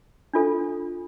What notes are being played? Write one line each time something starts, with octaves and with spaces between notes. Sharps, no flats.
D4 F4 A4